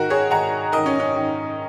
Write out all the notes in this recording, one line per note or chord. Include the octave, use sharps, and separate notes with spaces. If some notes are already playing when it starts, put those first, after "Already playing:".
Already playing: G#2 D#3 F#4 A#4
G#4 C#5
G#2 D#3 F#5 A#5
G#2 D#3 A#4 D#5
C#4
C#4
G#2 D#3